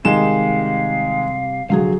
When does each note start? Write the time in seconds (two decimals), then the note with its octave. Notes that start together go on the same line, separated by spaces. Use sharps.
0.05 C3 D#3 G3 G#3 G4 F5 E7
1.70 C2 D3 F3 F#3 G#4 F5